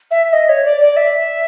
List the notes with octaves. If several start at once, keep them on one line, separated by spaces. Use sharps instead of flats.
E5
D#5
C#5
D5
D5
E5